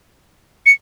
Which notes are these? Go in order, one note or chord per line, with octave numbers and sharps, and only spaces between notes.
C#7